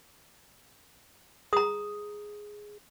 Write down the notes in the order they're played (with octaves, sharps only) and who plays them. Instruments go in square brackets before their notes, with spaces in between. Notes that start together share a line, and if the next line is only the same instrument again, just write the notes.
[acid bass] G#4 [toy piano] A#5 D#6